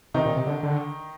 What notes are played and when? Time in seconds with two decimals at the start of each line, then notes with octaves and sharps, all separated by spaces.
0.14 C3 D#3 D#4
0.26 A#2
0.36 C3
0.47 D3
0.63 D3